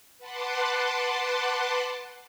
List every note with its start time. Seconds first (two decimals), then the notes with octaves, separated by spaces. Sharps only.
0.18 B4 F#5 A5 C6 D6